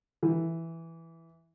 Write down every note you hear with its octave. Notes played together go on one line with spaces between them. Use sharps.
E3